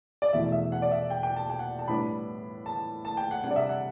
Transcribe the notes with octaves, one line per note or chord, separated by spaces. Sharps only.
D5
E2 B2 A3 E4 E5
E5
F#5
D5
E5
G5
G5
A5
G5
F#5
A5
A2 G3 B3 D4 B5
A5
A5
G5
F#5
C3 G3 D4 F#5
D5
E5
F#5